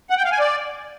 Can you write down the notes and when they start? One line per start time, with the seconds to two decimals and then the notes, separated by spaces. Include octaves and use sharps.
0.10 F#5
0.17 G5
0.25 F5
0.32 G#5
0.39 D5